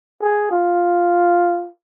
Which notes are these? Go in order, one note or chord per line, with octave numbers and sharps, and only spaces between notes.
G#4
F4